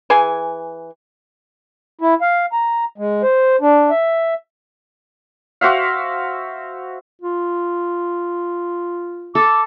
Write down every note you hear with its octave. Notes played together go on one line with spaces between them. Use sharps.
E3 G#4 G#5
E4
F5
A#5
G#3
C5
D4
E5
F#4 C5 E5 F5
F4
A4 D6